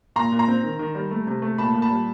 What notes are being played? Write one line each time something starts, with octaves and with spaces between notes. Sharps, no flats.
A#2 A#5 C6
A#2
A#5 C6
C4
D#3
D#3
G3
A3
C3
A3
A#2 A5 B5
A#2
A5 B5
G3